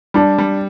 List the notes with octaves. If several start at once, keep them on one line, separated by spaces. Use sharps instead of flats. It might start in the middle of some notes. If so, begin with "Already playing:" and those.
G3 D4
G3